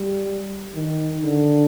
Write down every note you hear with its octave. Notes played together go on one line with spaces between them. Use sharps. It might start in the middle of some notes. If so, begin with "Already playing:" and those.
Already playing: G3
D#3
D3